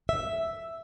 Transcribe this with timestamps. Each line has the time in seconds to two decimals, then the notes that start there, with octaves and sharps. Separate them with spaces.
0.09 E5